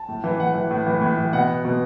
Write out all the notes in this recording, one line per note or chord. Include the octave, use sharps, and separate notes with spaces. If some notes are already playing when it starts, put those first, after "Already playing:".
Already playing: A5
A2
E3
A2 F#5
E3
A2
E3
A2
E3
B2 F#5
B2